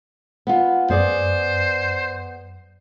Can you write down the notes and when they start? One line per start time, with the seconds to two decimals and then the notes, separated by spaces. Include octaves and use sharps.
0.47 B3 F4
0.90 F#2 B3 G#4 C5 D5